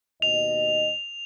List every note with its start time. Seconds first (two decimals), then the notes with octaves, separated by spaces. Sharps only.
0.22 D#2 B2 D#5 F7